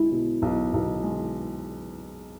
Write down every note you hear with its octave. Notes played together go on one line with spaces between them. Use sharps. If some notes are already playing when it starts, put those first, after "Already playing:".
Already playing: B1 G#3 E4
B2
B1
B1
G#3